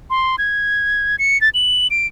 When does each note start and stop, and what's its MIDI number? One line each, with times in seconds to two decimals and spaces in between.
0.10 0.36 84
0.38 1.16 92
1.19 1.40 97
1.41 1.49 93
1.54 1.87 102
1.91 2.07 98